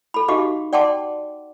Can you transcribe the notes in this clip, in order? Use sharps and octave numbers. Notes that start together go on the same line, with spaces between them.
A4 B5
D#4 F#4 G4 D#5 F5 D6
D5 F#5 G5 A5 C6 D6